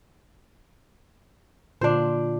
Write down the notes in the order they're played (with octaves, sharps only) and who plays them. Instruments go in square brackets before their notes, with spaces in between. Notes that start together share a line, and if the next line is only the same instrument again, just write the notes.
[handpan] A#2 D3 F4 [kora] D4 C5